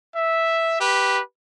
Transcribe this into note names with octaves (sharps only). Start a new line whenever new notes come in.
E5
G4 B4